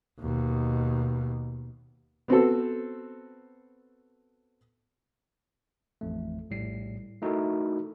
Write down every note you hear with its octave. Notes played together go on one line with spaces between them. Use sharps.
D#2 B2
B3 C4 F#4 A4
A1 F2 A3
A#1 A2 G3 C7
A3 D#4 E4 F#4 A4 A#4